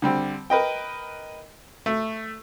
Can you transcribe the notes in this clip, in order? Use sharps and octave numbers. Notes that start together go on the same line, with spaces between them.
D3 G3 C4
A#4 B4 D#5 G5
A3